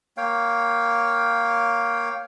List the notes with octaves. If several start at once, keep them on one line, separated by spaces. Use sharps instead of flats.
A#3 C#5 F5 G5